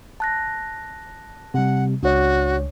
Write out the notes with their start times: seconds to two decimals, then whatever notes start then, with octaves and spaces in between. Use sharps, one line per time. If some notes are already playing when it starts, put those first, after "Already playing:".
0.20 A5 F#6 A#6
1.54 C3 G3 F#5
2.03 C#2 D4 F#4 C#5 D5